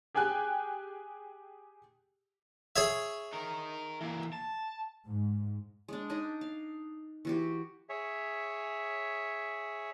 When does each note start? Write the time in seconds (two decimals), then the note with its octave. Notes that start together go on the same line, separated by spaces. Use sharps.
0.15 G4 G#4 G5 G#5 F#6
2.76 G#4 C#5 E5
3.33 D#4 A#4
4.01 E3 A#3
4.33 A5
5.07 G#2
5.88 G#3 D4
6.09 D4 D#4 D#5 G#5
6.41 F5
7.25 E3 F#4 G4
7.89 G#4 C#5 E5